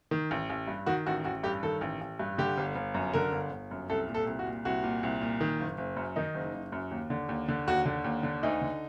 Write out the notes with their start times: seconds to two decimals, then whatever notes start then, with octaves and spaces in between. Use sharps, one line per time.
0.11 D#3
0.31 A1
0.50 A1
0.68 G2
0.86 D#3 F#4
1.06 A1 F#4
1.24 A1 F#4
1.43 G2 G4
1.63 D#3 A4
1.81 A1
2.01 A1
2.19 G2
2.38 D3 G4
2.58 G1
2.76 G1
2.94 F#2
3.13 D3 A#4
3.32 G1
3.51 G1
3.71 F#2
3.90 C2 A4
4.08 A#2
4.15 A4
4.27 C2
4.39 F#4
4.46 A#2
4.65 C2 F#4
4.83 A#2
5.03 C2
5.21 A#2
5.41 D#3
5.59 F#1
5.78 F#1
5.96 F#2
6.16 D#3 D#4
6.34 F#1
6.54 F#1
6.72 F#2
6.91 D#2
7.10 D3
7.29 D#2
7.48 D3
7.67 D#2 F#4
7.86 D3
8.04 D#2
8.23 D3
8.43 D2 D#4
8.62 D3